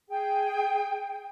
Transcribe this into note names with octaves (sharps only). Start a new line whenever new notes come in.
G#4 G5